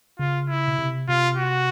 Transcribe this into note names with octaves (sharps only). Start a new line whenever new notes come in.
C#3 F4
E4
B2
C3
C3 F4
F#4